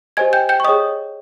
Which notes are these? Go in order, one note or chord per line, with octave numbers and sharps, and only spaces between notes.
G4 C5 D#5 G#5 G#6
G5 G6
G5 G6
C#6
G#4 C#5 D#5 G5 D#6